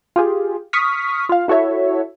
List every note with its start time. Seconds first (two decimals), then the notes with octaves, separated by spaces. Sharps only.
0.16 F4 G4 G#4
0.73 C#6 D#6 F6 B6
1.29 F4 F5
1.48 E4 F#4 A4 C#5 E5